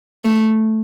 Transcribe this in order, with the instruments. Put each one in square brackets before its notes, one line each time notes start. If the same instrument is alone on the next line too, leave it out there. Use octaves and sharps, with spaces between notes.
[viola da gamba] A3